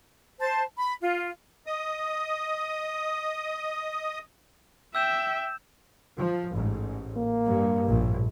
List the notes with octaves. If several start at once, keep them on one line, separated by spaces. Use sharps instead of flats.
C5 A5
B5
F4
D#5 D#6
E5 G5 E6 G6 E7
F3
A1 G#2
A#3
G2
A#1 A2